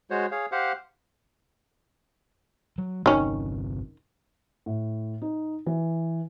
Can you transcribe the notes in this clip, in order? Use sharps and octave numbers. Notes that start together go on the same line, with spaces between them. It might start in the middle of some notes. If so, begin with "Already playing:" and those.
G#3 F#4 C5 C#5
G#4 C#5 F5
G4 C5 F5 F#5
F#3
G1 C3 D#3 C#4
A2
D#4
E3